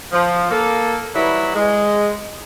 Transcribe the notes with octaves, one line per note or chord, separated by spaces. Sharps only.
F3
A#3 A4
E3 F#3 G3 E4
G#3